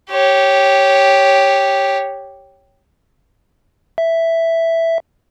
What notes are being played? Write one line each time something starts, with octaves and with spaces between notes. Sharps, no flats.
G4 C#5
E5